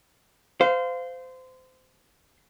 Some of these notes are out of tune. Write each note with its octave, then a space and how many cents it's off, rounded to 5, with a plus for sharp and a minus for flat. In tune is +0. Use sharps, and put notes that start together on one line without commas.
C5 -25 F5 +0